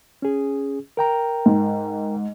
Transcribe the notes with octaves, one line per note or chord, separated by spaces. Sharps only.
C#4 G#4
A#4 G5 A#5
G#2